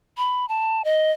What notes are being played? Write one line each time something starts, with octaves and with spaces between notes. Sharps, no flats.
B5
A5
D#5